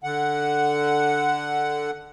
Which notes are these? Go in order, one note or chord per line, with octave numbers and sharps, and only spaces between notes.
D3 F#5